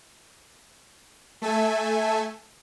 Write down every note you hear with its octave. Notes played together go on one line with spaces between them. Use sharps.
A3 A4 E5 G#5